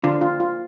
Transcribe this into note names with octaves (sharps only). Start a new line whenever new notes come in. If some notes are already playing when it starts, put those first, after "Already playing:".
D3 F4
F4
F4